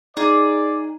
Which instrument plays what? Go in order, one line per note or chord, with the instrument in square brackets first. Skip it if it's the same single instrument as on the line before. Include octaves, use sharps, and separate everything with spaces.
[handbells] D#4 [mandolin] G#4 [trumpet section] D5